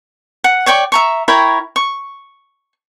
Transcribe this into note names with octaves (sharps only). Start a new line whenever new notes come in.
F#5
C#5 D5 G5 C#6
E5 A#5 C#6
E4 A#4 C#5 G5
C#6